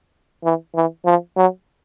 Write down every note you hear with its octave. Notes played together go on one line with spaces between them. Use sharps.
E3
E3
F3
F#3